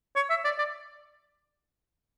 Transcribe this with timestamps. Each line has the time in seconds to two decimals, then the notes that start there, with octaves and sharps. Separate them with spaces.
0.16 C#5
0.30 E5
0.44 D5
0.58 D5